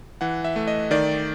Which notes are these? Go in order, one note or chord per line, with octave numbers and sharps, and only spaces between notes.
E3 F#5
E5
A3
D#5
D#3 D5